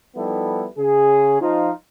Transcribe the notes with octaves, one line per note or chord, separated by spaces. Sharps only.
F3 G3 B3 D#4 E4 A4
C#3 G#4
F3 D#4 F4